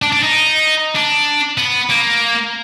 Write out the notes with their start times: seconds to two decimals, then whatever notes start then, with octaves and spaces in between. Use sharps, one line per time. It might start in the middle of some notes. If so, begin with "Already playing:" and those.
0.02 D4
0.12 D4
0.23 D#4
0.95 D4
1.58 B3
1.90 A#3